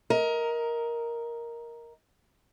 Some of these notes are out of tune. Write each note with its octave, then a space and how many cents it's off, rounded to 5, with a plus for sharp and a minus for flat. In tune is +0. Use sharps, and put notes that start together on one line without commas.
A#4 +5 D#5 +25